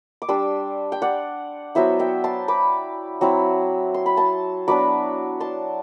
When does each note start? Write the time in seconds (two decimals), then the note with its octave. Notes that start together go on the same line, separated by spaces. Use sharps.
0.22 D6
0.29 G3 D4 C6 E6
0.92 G5
1.02 D5 F#5
1.75 F#3 B3 E4 C5 E5
1.99 E5 G5
2.24 A5 C6
2.48 B5 D6
3.21 F#3 C4 E4
3.94 C6
4.06 B5
4.17 A5 C6
4.68 F#3 B3 D4 B5 D6
5.40 A5 C6